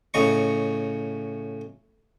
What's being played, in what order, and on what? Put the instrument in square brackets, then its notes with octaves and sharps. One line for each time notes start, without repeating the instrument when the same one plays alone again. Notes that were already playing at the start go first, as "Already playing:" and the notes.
[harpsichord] A2 C#3 D#5 A#5 C#6